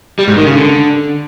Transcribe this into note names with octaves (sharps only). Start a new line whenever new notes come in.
G3
G#2
D#3
C#3
D3